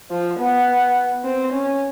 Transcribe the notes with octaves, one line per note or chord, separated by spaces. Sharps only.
F3
B3
C4
C#4